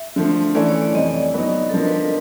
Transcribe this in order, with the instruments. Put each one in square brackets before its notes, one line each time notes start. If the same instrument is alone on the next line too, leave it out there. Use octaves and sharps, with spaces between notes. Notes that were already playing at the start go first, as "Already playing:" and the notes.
Already playing: [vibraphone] E5
[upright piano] D3 F3 A3
[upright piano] E3 A3 C#4 E4 A4 [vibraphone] D5
[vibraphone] C#5
D5
[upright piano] F2 C3 E3 [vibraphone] D#5
[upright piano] F#3 B3 D#4 F#4
[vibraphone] A4
[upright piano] D3 F3 A#3 [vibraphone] A#4
[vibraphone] B4
A#4